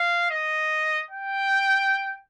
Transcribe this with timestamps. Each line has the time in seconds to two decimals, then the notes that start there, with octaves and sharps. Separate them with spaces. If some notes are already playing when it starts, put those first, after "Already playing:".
Already playing: F5
0.31 D#5
1.11 G5